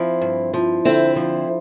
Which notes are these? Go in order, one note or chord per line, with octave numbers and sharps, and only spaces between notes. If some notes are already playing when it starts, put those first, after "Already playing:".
Already playing: F3 C4 E4
G2
F3
D3 C4 E4
F3